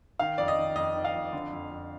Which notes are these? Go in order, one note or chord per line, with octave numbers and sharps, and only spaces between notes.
D#3 F5
F2 D5
D#5
D#3
F2 D#5
D#3
F5
F2
D3
F2
F2